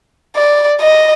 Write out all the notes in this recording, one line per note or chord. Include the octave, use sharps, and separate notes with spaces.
D5
D#5